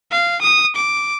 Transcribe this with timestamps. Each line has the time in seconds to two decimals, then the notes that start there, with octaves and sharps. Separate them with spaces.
0.11 F5
0.42 D#6
0.76 D6